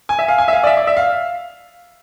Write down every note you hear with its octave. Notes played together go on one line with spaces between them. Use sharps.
G#5
E5
F5
G#5
E5
F5
D5
E5
D5
E5
F5